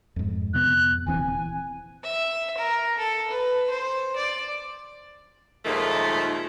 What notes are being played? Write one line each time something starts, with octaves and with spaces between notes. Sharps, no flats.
F2 G#2
F2 C3 B3 F#6
D#1 E3 C4 G#5
E5
A#4
A4
B4
C5
D5
D#2 A#2 D#3 F3 G#3 A3